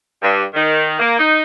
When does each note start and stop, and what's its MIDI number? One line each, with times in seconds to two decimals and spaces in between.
0.22 0.42 43
0.54 0.97 51
1.00 1.18 58
1.19 1.43 63